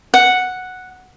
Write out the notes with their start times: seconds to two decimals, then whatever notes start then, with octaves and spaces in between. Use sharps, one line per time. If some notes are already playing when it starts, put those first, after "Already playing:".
0.14 F#5